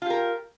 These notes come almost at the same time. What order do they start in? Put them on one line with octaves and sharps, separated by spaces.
F4 G4 A#4